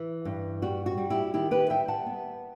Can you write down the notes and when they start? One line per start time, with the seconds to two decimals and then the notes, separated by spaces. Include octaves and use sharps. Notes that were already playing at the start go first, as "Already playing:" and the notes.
Already playing: E3
0.25 G2
0.62 G3 F#4
0.86 F#4
0.98 G3
1.10 E4 G4
1.34 D#3 E4 G4
1.51 G4 B4
1.70 G3 E5 G5
1.88 F#5 A5
2.06 B3